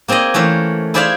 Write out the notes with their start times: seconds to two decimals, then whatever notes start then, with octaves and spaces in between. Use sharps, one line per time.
0.08 A#3 C4 G#4 D5 D#5
0.34 E3 A3 C#4 A4 A#4 C5
0.94 E4 G#4 C5 D5 E5 F5